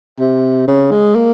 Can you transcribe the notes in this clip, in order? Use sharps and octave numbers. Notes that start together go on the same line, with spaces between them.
C3
C#3
G#3
A#3